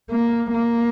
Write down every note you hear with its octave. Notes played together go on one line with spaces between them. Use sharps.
A#3
A#3